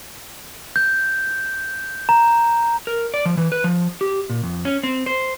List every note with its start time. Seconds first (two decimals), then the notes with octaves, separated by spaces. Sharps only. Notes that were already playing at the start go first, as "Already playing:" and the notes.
0.76 G6
2.09 A#5
2.87 A#4
3.14 D5
3.26 F3
3.37 E3
3.52 B4
3.64 F3
4.01 G4
4.30 A#2
4.44 F2
4.65 C#4
4.83 C4
5.06 C5